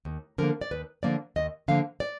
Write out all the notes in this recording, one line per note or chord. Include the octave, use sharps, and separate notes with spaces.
D#2
D3 F3 A#3 A#4
D5
D#2 B4
D3 F3 A#3 D5
D#2 D#5
D3 F3 A#3 F5
D5